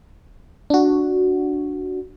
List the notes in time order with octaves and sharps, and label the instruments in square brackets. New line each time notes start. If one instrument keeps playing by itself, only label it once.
[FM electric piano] D4 F#4